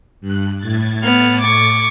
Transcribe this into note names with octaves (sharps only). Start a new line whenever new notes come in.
G2 F#6
A2 G#6 A6
B3 F6
C#6 D6